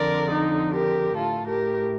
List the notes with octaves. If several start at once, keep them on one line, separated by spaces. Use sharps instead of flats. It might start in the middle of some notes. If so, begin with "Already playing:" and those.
Already playing: F2 D3 A#4 D5
D#4
G4 A#4
A2 F4 A4
G4 A#4